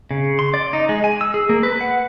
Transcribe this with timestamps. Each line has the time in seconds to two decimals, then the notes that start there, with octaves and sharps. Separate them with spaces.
0.11 C#3
0.39 C6
0.54 D5
0.73 D#4
0.89 G#3
1.04 G#5
1.21 E6
1.34 G#4
1.49 A#3
1.63 B4
1.81 F#5